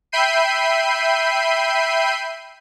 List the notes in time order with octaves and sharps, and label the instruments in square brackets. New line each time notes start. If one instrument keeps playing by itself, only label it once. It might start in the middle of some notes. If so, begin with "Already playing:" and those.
[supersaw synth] E5 G5 B5 G6 C7 D#7